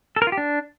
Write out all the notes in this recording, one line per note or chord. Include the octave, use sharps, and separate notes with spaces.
A4
A#4
F4
G4
D4